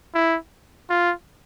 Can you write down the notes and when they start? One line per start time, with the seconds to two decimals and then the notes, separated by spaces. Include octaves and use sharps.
0.15 E4
0.90 F4